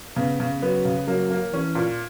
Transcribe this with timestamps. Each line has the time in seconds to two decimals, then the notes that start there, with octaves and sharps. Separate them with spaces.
0.16 C#3 B3
0.40 C#3
0.62 F#3 B3
0.85 C#3
1.07 F#3 A#3
1.31 A#3
1.53 E3 C#4
1.75 A#2